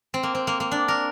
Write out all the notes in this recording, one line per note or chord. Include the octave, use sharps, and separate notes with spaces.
C4
A#3
C4
A#3
A#3
D4
A#4